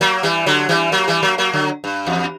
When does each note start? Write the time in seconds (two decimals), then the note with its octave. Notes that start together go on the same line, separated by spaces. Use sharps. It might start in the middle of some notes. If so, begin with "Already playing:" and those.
0.01 F#3 A#3
0.23 E3 G3
0.46 D3 F#3
0.69 E3 G3
0.92 F#3 A#3
1.08 E3 G3
1.23 F#3 A#3
1.38 F#3 A#3
1.53 D3 F#3
1.84 G2
2.06 E2